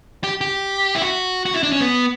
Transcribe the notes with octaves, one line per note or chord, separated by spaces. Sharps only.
G4
G4
E4
F#4
F#4
E4
D4
C#4
B3